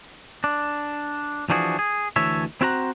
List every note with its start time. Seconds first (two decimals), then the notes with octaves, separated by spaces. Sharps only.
0.44 D4
1.50 E3 F3 D4 F#4 G#4
1.79 G#4
2.16 D2 E3 A4 C#5 E5
2.61 C4 E4 F#4 C5 F#5 A#5